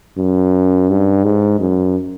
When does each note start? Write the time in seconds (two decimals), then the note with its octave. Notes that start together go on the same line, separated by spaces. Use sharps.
0.18 F#2
0.90 G2
1.24 G#2
1.60 F#2